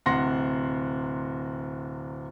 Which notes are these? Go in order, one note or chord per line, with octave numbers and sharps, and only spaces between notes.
D1 C3 F#5 C6 A#6